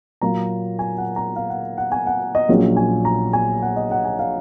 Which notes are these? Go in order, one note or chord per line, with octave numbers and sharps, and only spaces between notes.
A#2 F#3 A#3 F4 A#5
G#5
F#5
A#5
F5
F#5
F#5
G#5
F#5
D#5
A#1 A#2 F#3 C#4
G#5
A#5
G#5
F#5
D#5
F#5
G#5
F5